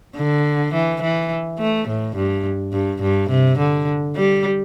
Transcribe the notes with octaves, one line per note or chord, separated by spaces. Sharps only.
D3
E3
E3
A3
A2
G2
G2
G2
C3
D3
G3